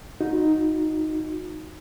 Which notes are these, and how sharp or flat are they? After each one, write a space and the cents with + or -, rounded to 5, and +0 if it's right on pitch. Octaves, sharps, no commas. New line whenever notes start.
D#4 +0 F#4 -35